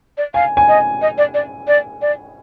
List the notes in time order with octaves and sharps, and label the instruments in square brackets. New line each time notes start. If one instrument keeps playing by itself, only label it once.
[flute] D5
[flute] F5 [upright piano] G#5
[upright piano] G#5
[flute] D#5
D#5
D5
D5
D5
D5